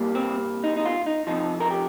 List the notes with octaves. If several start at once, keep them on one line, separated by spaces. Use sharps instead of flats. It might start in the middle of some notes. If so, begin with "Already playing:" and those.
Already playing: G2 G3 A#3
C4
D#4
D#4
F4
D#4
F2 C3 F3 D#4
A#4
G4